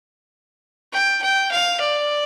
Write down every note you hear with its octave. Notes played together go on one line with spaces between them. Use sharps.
G5
G5
F5
D5